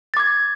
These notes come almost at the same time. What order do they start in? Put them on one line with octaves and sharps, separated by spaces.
A6 D6 G#6